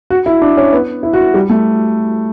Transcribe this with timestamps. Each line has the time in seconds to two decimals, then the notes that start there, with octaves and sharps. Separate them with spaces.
0.10 F#4
0.26 E4
0.42 D4
0.57 C#4
0.73 B3
1.03 E4
1.13 F#4
1.34 G3
1.50 A3